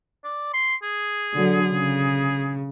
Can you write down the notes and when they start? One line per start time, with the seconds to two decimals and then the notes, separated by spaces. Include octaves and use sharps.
0.24 D5
0.54 C6
0.83 G#4
1.34 D3 F#3
1.73 C#3